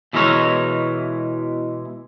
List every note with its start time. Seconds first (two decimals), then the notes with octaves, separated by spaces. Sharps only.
0.13 B2 E3 G#3 E4 A#4 C#5